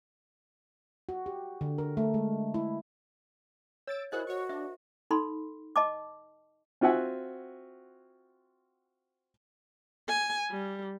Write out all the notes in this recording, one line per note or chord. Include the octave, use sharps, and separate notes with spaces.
F#4
G4
D3
A#4
A3
G#3
E4
C#5 E6 A6 D7
E4 F#4 G#4 A#4 C5 D#5 F#6
F#4 C#5 C#6
D4 E5
D#4 A4 B5 C6
D#5 A5 D6
C4 F4 F#4 E5 F#5 G#5
G#5
G3